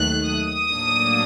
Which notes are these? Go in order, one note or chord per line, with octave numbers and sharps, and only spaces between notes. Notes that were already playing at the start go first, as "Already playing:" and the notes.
Already playing: D#2 D#3 F#3 A3 F#6
D#6
A2 F#3 A#3 D4